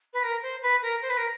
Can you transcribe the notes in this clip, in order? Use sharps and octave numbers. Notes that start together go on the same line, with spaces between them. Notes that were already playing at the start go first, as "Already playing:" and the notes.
B4
A#4
C5
B4
A#4
C5
B4
A#4